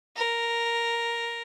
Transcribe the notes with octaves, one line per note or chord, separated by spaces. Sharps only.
A#4